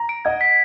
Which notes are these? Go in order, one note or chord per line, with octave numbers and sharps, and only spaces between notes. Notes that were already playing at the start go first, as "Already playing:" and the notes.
Already playing: A#5
D7
D#5 F#5 G#6
B6